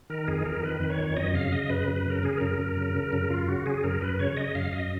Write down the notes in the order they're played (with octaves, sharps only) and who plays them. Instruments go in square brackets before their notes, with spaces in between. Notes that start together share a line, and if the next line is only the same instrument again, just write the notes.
[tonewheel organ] D#3 A#4
F2 G#4
F2 A#4
D#3 B4
D#3
C#5
F2
F#2 D#5
C#3 F5
C#3 D#5
F#2 B4
F#2
B4
C#3 A#4
C#3 G#4
F#2 A#4
F#2
C#3
C#3
F#2
F#2 F4
C#3 F#4
C#3 G#4
F#2 A#4
F#2 B4
C#3 C#5
C#3 D#5
F#2 F5
F#2 D#5